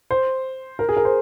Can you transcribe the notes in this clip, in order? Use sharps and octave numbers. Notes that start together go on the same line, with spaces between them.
C5
A#4
G#4
A#4
C5